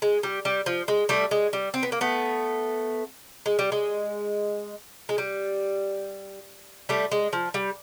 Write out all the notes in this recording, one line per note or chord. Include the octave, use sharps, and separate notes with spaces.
G#3
G3
G3
F3
G#3
G3 A3
G#3
G3
C4
B3
A#3
A3 B3
G#3
G3
G#3
G#3
G3
G3 A3
G#3
F3
G3